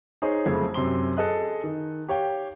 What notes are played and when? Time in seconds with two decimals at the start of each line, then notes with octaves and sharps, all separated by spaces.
0.22 D#4 G#4 C5 C#5 D#5
0.46 F#1 F2 G#3 A3 G#6
0.74 F#2 C3 C4 C6 G7
1.17 G#4 A4 D#5 F#6
1.64 D#3
2.09 G4 C#5 F5 G5